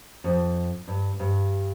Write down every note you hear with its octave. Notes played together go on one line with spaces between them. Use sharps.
F2
G2
G2